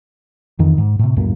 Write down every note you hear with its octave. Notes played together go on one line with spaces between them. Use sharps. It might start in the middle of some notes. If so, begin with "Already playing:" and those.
F2 D#3 E3
G#2
A2 C3
C#2 F#2 A2 A#3